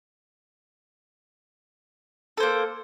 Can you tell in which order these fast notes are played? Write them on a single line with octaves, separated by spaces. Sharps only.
A4 C5 A#3